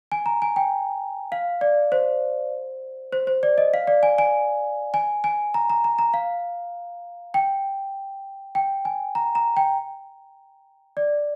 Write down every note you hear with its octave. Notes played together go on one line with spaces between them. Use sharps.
G#5
A#5
G#5
G5
F5
D5
C5
C5
C5
D5
D#5
F5
D5
G#5
G#5
G#5
G#5
A#5
A#5
A#5
A#5
F5
G5
G5
G#5
A#5
A#5
G5
D5